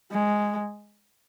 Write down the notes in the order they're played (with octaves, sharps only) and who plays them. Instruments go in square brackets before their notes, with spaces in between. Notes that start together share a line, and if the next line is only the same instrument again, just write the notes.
[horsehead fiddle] G#3